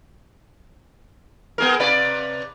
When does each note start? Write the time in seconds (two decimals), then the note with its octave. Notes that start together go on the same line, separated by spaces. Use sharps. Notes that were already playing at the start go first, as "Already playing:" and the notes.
1.58 B3 G#4 A#4
1.80 C3 B4 D5